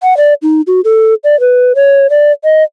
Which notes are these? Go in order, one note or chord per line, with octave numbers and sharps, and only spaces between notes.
F#5
D5
D#4
F#4
A4
D5
B4
C#5
D5
D#5